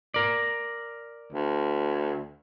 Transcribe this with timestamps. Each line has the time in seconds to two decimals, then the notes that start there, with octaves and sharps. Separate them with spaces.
0.14 A#4 D5
1.32 D2